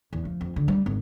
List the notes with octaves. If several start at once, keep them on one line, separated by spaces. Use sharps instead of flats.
E2
F3
F2
D3
G3
G#1